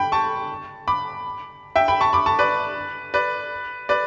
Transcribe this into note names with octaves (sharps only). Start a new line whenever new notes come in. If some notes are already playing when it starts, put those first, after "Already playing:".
Already playing: G5 B5
A5 C#6
B5 D6
E5 G5
G5 B5
A5 C#6
B5 D6
A5 C#6
B4 D5
B4 D5
B4 D5